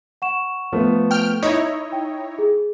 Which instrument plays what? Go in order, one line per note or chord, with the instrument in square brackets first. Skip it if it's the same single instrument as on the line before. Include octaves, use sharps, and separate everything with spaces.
[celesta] F#5 C#6 E7
[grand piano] F3 A3 B3
[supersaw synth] G5 F6
[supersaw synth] D#4 E4 C#5 [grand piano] D#5
[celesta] G5
G#4